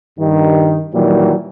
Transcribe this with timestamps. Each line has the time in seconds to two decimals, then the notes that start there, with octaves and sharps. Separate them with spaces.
0.19 G2 D#3
0.94 A#2 D#3 E3 F#3 G3